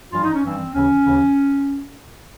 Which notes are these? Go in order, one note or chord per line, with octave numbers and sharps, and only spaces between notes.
G2 E3 G3 F4
D#4
C#4
G2 E3 G3 C4
D#2 C#3 E3 C#4
D#2 C#3 E3